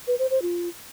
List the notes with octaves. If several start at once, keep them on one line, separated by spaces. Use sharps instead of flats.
B4
C5
C5
F4